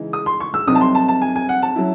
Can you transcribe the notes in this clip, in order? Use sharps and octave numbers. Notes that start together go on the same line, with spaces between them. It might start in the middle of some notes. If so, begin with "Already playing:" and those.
Already playing: C#3 E3 G#3 D#4
D#6
C6
C#6
E6
C2 C3 F#3 C4 D#4 D#6
A5
C6
A5
A5
G#5
G#5
F#5
A5
F#3 C#4 E4